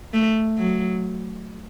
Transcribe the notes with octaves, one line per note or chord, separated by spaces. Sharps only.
A3
F#3